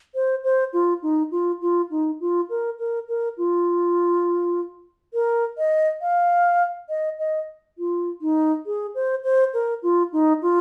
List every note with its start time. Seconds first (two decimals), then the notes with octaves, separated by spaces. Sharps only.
0.15 C5
0.44 C5
0.73 F4
1.03 D#4
1.31 F4
1.61 F4
1.91 D#4
2.21 F4
2.50 A#4
2.79 A#4
3.08 A#4
3.37 F4
5.14 A#4
5.58 D#5
6.02 F5
6.89 D#5
7.19 D#5
7.78 F4
8.21 D#4
8.66 G#4
8.95 C5
9.24 C5
9.54 A#4
9.83 F4
10.13 D#4
10.42 F4